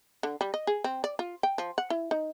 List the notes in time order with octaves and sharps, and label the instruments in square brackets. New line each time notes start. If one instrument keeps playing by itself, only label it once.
[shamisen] D3
G3
D#5
G#4
C4
D5
F4
G5
F3
F#5
E4
D#4